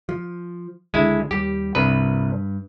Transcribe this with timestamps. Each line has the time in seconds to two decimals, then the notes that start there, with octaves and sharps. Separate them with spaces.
0.09 F3
0.94 C#2 D3 G#3 D4 E4
1.31 D#2 G3 G4
1.75 C2 G2 B4